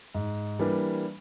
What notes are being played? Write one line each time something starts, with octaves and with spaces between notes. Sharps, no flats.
G#2
E3 G3 A#3 D4